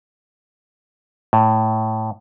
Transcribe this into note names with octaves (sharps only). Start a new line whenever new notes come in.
A2